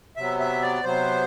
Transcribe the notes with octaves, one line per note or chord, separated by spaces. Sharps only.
C3 F#3 B3 E5
E5
D5
C3 F#3 B3 C5